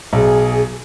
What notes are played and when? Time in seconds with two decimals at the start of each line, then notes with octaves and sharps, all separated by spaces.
0.13 B1 G#4